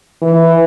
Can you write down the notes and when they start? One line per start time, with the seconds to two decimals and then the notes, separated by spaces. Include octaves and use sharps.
0.22 E3